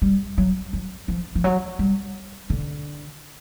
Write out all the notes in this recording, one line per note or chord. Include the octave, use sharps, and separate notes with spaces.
G3
F#3
F#3
F3
F3
F#3
G3
D3